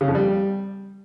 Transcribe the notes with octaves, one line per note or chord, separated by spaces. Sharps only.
C#3
F2
G3